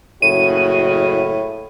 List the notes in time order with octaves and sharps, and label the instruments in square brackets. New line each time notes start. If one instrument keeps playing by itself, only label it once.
[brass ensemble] F#1 C#3 F#4 [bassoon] A2 [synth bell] D#7